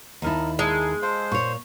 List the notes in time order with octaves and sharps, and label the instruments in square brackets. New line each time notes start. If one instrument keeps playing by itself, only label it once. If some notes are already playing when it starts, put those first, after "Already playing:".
[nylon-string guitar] D#2 E4 [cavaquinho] D#4 A#4 A5
[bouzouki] G#3 [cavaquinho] A4 A#4
[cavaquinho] F4 A4 [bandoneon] C5
[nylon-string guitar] A#2 C#5 [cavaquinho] C#6